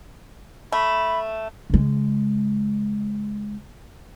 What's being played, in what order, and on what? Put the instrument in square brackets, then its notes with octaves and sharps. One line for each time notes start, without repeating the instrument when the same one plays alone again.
[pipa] A3 [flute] B5
[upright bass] C#3 G#3